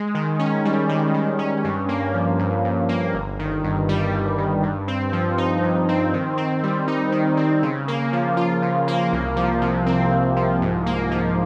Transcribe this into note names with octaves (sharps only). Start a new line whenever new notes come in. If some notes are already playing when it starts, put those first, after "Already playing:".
Already playing: G#3
D#3
C#4
G3
D#3
D#3
C#4
G2
A#3
F3
G2
G2
A#3
G1
D#3
G2
G3
G1
D#3
G2
C4
F3
D#4
G2
C4
D#3
C4
G3
D#4
D#3
C4
C#3
A#3
F3
F4
C#3
A#3
C2
F3
C3
C4
C2
F3
G#2
A#3
F3